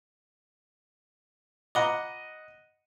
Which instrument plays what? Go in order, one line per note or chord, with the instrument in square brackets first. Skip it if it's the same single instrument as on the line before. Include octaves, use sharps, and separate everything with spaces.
[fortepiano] D#5 F#5 [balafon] A#5 B5 D6